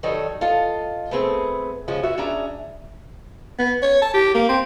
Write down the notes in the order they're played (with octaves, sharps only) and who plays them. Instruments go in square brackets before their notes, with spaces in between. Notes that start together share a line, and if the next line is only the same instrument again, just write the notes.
[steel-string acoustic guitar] D#3 F#3 G3 A4 C#5 D#5
F4 A4 D#5
A3 B3 C4 G#4
C#3 F3 G#3 C#4 F#5
F4 F#4 E5
C#4 D4 G#4 E5 A#5
[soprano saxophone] B3
C#5
A5
G4
A#3
C4